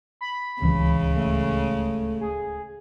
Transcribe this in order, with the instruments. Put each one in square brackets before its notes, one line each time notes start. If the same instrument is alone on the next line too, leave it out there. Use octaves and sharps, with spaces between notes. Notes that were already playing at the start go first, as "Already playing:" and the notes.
[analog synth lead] B5
[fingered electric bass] D1 C#2 E3 [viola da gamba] C#3 G#3
[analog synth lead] A3
G#4